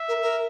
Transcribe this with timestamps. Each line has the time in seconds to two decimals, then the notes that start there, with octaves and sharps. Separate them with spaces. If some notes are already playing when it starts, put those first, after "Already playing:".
Already playing: E5
0.08 A#4
0.22 A#4